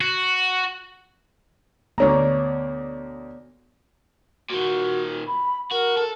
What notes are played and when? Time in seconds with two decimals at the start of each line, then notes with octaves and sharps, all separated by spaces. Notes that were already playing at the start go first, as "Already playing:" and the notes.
0.01 F#4
1.98 D2 B3 D4 C#5 D5 A#5
4.50 A#2 D#3 F#4
5.28 B5
5.72 F#4 A#4
5.97 A4